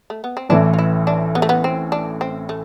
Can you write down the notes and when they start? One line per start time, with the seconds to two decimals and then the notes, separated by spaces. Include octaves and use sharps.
0.10 A3
0.24 B3
0.37 C4
0.49 A1 A2 E3 D4
0.74 F4
0.79 E4
1.07 D4
1.35 B3
1.42 A3
1.49 B3
1.64 C4
1.92 D4
2.21 C4
2.49 A3